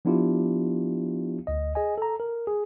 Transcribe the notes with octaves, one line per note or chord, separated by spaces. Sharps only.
F3 B3 D4 E4 F4 G4
D2 D#5
G#4 D#5 G#5
A4 A#5
A#4
G#4